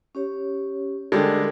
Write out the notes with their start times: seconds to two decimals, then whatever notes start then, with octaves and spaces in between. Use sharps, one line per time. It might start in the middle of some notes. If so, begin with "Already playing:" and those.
0.15 C#4 G4 C#5
1.12 D3 G3 G#3 A4 A#4